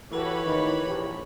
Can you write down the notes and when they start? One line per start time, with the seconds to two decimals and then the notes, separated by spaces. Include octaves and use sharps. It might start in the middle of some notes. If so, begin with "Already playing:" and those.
0.13 E3 F#4 G4 A4 B4 C#5 B5
0.45 A1 D#2 D#3
0.87 A#1 G4